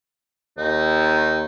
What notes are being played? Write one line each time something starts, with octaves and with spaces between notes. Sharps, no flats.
D#2 D#4